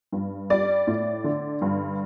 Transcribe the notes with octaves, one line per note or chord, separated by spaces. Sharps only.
G2
G3 D5
A2
D3
G2